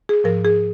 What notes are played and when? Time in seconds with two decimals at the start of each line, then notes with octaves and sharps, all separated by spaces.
0.09 G#4
0.24 G#2 F3 A#4
0.45 G#4